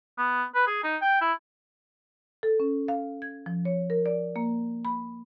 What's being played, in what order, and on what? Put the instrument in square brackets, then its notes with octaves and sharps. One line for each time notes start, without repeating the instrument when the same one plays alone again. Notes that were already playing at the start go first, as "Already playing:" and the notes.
[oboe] B3
B4
G#4
D#4
G5
E4
[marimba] A4
C#4
F5
G#6
F3
C#5
A#4
D5
A#3
B5